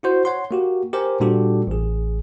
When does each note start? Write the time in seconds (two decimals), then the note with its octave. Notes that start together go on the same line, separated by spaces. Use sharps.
0.03 E4 F#4 C5
0.25 C#5 F#5 C6
0.51 A#3 F#4 G4
0.93 G4 A#4 C5 G#5
1.20 A#2 G3 D4 F#4 G4 A4
1.67 A1 G#4